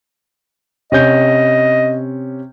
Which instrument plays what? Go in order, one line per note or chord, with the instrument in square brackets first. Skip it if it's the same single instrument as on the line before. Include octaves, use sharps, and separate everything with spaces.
[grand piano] C3 C#4 G6 [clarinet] D#5